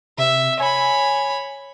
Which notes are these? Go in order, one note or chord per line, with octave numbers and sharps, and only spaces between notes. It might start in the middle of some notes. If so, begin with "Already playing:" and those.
C3 E5
C#5 G#5 B5